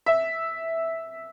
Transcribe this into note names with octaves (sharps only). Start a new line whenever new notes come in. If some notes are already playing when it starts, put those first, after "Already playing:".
E5